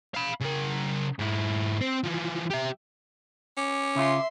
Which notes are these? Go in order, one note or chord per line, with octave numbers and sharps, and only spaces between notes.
F5 B5
C#3 A#4
G#2 E4
C4 C5
E3 F3
G4 E5
C#4 D6
C#3 F4 E5 C6